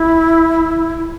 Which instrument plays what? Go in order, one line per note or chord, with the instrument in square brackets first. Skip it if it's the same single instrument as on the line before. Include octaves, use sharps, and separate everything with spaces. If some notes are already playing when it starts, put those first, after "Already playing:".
Already playing: [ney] E4